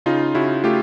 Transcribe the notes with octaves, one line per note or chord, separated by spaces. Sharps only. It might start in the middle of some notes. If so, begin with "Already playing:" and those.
C#3 D#4 F4
C#3 E4 F#4
A3 F4 G4